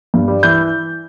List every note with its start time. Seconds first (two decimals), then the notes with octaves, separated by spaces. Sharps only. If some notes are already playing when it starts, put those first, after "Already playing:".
0.14 G2
0.28 G3
0.43 E3 G6